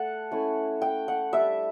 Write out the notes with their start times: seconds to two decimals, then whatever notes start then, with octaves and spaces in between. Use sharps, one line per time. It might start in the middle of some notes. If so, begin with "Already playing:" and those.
Already playing: A3 F#5 A5
0.31 A3 C#4 E4
0.82 G5
1.08 F#5
1.33 G3 D4 E5